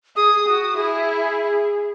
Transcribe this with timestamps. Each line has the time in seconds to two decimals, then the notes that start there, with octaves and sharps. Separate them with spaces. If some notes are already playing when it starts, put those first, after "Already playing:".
0.16 G#4 D#6
0.48 F#4
0.77 E4 G#4